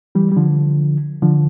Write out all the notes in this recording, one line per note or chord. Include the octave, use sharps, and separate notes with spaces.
E3 G3
G3
D3 F3
D3 F3